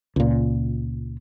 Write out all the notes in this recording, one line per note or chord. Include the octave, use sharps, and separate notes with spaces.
C#2 A#2